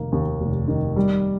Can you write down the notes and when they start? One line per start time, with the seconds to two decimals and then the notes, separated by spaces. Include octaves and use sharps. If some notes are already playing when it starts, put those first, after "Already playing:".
Already playing: F1 D#3 A#3
0.12 D#2
0.40 F1
0.68 D#3
0.96 G3